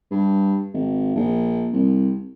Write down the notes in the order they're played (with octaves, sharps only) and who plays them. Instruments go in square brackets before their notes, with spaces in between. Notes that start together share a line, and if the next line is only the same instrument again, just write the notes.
[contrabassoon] G2
G#1
A#1
C2